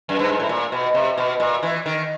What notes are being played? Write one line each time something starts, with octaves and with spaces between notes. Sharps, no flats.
F#2
G2
G#2
A2
A#2
B2
C3
B2
A#2
E3
D#3